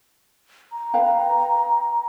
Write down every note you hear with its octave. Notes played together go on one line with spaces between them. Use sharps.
A#5
B4 F5 G5